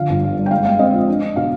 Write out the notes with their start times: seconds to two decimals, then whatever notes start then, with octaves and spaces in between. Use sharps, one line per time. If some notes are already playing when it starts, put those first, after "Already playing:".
Already playing: D3 F3 F5
0.09 G1
0.23 G2
0.37 G2
0.46 G5
0.51 G#3 F5
0.65 G#3 F5
0.79 C4 D#5
0.93 F3
1.07 D4
1.22 D4
1.36 B2 F5